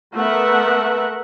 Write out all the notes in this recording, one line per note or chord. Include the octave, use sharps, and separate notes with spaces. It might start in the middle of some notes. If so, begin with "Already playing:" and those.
A3 B3 A#4 B4 E5 F#5